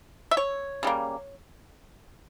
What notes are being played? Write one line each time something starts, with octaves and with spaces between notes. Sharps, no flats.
E5
C#5
C#3 G3 A#3